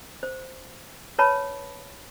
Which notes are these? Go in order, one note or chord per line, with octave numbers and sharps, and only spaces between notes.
C5
B4 C#5 A5 B5